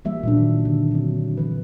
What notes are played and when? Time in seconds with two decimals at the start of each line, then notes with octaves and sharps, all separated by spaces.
0.05 E3 G3 A#3 E5
0.23 A#2 F#3 D4
0.37 D#3
0.65 D3
0.91 F#3 C4
1.37 E3 B4